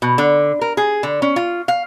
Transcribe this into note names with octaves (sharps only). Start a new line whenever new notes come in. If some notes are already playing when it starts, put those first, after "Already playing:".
B2
D3
A#4
G#4
D3
C#4
F4
F5